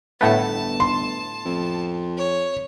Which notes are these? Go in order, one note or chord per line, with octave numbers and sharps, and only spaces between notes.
G1 A2 A3 B3 A5
C6
F2
C#5